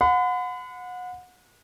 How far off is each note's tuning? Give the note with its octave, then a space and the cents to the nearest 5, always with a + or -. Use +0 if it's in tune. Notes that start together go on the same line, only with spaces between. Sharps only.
F#5 -30 B5 +40